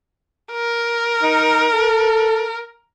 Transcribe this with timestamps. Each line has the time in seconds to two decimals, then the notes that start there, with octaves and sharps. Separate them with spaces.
0.53 A#4
1.23 D#4
1.74 A4